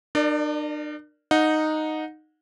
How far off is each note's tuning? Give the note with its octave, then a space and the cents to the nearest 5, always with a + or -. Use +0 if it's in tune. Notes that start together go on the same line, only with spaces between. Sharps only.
D4 +45 A#4 +0 D5 +5
D#4 -5 F#5 -25